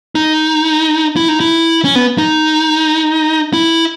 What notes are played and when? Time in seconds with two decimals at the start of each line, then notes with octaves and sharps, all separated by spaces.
0.15 D#4
1.16 E4
1.28 D#4
1.40 E4
1.84 C#4
1.95 B3
2.18 D#4
3.53 E4